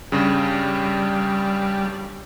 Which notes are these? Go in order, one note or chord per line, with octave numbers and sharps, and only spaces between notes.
G2 C#3 G3